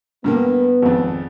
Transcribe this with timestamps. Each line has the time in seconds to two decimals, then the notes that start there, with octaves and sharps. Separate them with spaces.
0.24 G2 D3 A#3 B3
0.82 G#1 F2